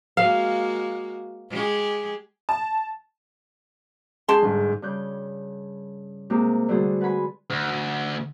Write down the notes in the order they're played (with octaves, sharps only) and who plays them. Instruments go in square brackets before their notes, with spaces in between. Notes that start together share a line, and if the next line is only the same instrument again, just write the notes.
[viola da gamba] G#3 A#3 F#4 [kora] F5
[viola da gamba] G#3 G4 G#4
[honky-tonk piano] A5
[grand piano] G#3 [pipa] G4 A5 C6
[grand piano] G1 G#2
[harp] G2 C#3 F#6 G6
C3 G#3 A#3 G4
D3 G3 A3 F#4 G#4 C5
B4 F#5 G#5 B5 C6
[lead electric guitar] D2